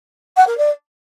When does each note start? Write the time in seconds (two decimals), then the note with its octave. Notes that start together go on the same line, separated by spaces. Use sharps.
0.37 F#5
0.47 A#4
0.58 D5